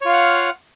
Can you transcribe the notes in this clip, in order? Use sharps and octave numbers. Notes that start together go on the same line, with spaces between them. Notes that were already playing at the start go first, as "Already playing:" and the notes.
F4 C#5 F5 F#5